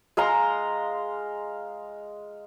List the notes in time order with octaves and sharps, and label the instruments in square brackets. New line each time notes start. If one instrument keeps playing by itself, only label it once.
[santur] G#3 F5 A#5 C6